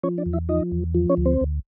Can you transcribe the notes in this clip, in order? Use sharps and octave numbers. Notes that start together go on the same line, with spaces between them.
F3 C#4 C#5
D4 D5
E2
E4 E5
F3 D#4 D#5
E2
F3
C#4 C#5
D2
C4 C5
D2